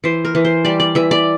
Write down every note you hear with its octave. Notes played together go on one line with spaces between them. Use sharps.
E3 C5
A#4
E3
C5
G3 D5
D5
E3 E5
D5